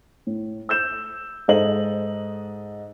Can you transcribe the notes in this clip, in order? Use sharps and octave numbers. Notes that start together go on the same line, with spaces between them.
A2
E6 G6 E7
G#2 G#3 A4 D#5 F#7